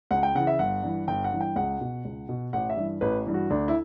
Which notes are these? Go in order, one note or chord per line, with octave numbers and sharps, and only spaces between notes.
C#2 F#5
G5
C#3 E3 F#5
E5
G1 F#5
G2 E3
G1 G5
F#5
G2 E3
G5
C#2 F#5
B2
C#2
B2
A1 F#5
E5
G2 E3
A1 B4
G2 E3
F#4
D2 D4
E4